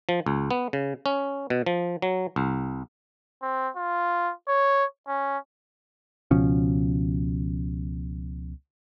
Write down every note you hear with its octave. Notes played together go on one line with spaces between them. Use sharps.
F3
C#2
B3
C#3
C#4
B2
F3
F#3
C2
C4
F4
C#5
C#4
C#2 B2 F3 C#4